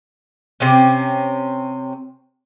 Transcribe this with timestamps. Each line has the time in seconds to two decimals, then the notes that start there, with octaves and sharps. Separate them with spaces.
0.60 C3 C4 C#4